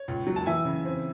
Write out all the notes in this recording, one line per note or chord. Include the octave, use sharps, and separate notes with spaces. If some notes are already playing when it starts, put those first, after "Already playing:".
Already playing: C#5
C#2
F#3
A5
E3 E5 G#5
C#3
C4